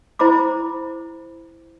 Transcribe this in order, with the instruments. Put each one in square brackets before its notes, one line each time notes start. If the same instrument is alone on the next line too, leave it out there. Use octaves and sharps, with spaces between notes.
[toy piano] E4 C5 A#5 B5 D6